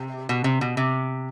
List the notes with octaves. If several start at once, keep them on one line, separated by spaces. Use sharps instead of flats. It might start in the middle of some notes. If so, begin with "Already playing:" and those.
Already playing: C3
B2
C3
B2
C3